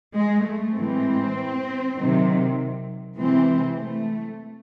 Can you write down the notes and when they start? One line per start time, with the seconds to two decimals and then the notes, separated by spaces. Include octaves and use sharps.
0.15 G#3
0.44 A3
0.76 A2 E3 G#3 C4
1.97 C3 D#3 F#3
3.18 C3 E3 G#3 C4
3.79 A3